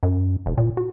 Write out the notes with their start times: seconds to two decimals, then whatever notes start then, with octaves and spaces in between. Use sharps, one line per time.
0.03 F#2
0.46 E1
0.57 A#2
0.77 F#4